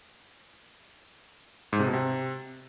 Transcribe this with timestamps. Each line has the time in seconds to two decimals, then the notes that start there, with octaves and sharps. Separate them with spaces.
1.73 G#2
1.80 C3
1.86 B2
1.93 C3